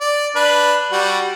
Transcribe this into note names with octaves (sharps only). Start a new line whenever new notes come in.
D5
D4 B4
G3 F#4